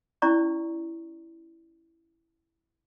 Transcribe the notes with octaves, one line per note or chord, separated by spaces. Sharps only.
C#4 E4 D5 A#5 C#6